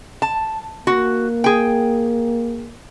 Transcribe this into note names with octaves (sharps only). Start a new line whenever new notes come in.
A5
A#3 F#4
G#4 G5